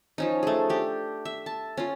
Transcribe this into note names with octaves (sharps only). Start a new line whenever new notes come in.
F3 C#4 D#4
A3 G#4
D4 G4
E5
A5
C#4 F4